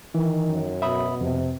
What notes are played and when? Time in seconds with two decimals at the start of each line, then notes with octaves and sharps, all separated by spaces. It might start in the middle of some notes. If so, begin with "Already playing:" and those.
0.15 D#3 E3
0.49 F#2
0.82 B2 E5 B5 D#6
1.21 F2 C3